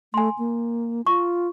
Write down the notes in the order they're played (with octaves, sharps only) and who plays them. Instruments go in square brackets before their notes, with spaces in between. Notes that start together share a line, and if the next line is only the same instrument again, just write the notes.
[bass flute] A3 [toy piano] G#5 C6
[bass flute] A#3
[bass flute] F4 [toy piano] C#6